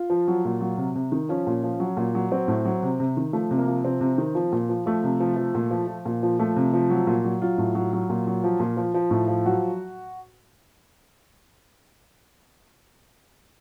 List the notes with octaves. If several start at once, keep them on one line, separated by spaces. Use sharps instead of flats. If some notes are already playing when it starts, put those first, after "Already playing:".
Already playing: F4
F3
F#3
A#2
F#3
C3
C3
D#3
F3 C#4
A#2
F3
F#3
A#2
F#3
F#3 C4
A2
F#3
C3
C3
D#3
F3 A3
C3
A#3
F3
C3 C4
C3
D#3
F3
A#2
F3
F3 A3
C3
F3
F3
A#2
F3
F3
A#2
F3
F3 A3
C3
F3
F#3
A#2
F#3
F#3 F4
A2
F#3
F#3
A#2
F#3
F3
A#2
F3
F3
A2
F3
F#3 F#4